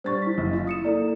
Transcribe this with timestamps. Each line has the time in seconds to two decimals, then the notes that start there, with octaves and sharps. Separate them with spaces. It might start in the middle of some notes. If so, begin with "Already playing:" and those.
0.04 G3 D4 C5 C#6 A6
0.22 E4 B6
0.38 F#1
0.53 F4
0.67 E4 D#6 C#7 E7
0.84 A#3 E4 A4 D5